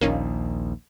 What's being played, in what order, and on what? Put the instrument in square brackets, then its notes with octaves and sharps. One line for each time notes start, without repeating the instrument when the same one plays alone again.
[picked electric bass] A#1 D#2 [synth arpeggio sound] A#3 C#4 D#4